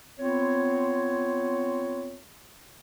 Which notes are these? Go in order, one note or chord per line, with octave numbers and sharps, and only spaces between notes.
B3 C4 F4 C#5